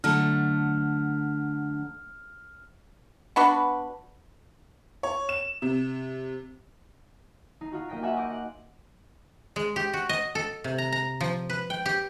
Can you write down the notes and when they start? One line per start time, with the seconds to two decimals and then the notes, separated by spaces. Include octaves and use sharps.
0.04 D3 F#3 A3 F6
3.36 B3 D4 F#4 B4
5.03 C#5
5.29 E7
5.62 C3
7.61 D#4 C7
7.72 D#4 F4 F#4
7.89 A#3 D#5 G5 B6 D7
8.02 F#4 E5 F#5 G#5 C6 D6
8.16 D#5 G#5 C6 D6 G6 D7
8.30 F#5
9.56 G#3
9.76 G4
9.93 F#4
10.09 D#5
10.35 A4
10.64 C3
10.78 A#5
10.92 A#5
11.20 F3
11.50 B4
11.70 G5
11.86 G4